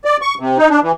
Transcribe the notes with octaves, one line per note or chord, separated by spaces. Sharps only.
D5
C#6
C3
D#4
D4
E3